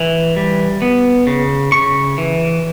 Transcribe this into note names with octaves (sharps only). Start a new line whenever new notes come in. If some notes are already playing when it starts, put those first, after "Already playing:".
Already playing: E3
G3
B3
C#3
C#3 C#6
E3